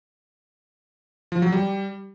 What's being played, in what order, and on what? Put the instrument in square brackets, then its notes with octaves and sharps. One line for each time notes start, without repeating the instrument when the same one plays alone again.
[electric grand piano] F3
F#3
G3